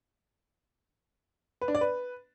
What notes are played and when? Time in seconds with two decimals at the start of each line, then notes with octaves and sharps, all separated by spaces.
1.61 B4
1.68 D4
1.75 D5
1.81 B4